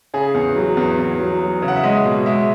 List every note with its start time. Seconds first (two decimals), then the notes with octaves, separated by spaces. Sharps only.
0.14 C#3 G#4
0.34 E2
0.56 F#3
0.77 E2
0.99 E2
1.20 F#3
1.41 F#3
1.62 C#3
1.68 F#5
1.76 E5
1.83 G#3 D#5
2.05 B2
2.26 G#3 E5